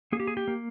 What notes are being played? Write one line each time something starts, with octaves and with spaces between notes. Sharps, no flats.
A#3 G#4
G4
G#4
G4
A#3